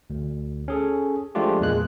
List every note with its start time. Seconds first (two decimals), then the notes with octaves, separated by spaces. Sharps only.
0.10 D2
0.68 C#4 G#4 A4
1.35 F3 G#3 A3 D4 F4 G4
1.61 E2 A#2 G#3 A#3 F#6